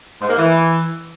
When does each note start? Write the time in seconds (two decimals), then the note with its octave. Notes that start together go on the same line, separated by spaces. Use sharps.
0.22 G#2
0.30 A#3
0.38 E3